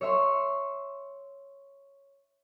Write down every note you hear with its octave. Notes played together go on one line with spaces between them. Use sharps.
C#5 E5 C6